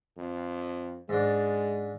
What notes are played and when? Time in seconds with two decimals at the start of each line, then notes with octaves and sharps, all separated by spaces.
0.17 F2
1.09 G#2 G#3 D4